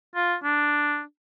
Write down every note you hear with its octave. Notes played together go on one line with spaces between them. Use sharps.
F4
D4